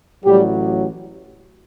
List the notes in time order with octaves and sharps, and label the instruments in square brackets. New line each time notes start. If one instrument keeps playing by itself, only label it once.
[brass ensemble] A1 A2 F#3 G3 G4